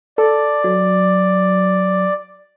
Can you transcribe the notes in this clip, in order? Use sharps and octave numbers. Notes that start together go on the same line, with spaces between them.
A4 D5
F#3